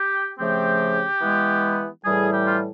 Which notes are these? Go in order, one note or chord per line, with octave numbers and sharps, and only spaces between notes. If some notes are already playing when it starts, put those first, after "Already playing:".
Already playing: G4
C#3 F3 A3 C4 G4
E3 G#3 B3
A2 E3 G3 G#4
G4
F4